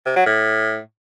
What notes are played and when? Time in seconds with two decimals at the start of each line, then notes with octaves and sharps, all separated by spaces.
0.06 C3
0.16 F#3
0.26 A2